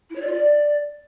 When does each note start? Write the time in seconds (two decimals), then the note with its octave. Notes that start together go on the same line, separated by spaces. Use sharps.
0.10 E4
0.16 C#5
0.21 D5
0.27 F4
0.33 D5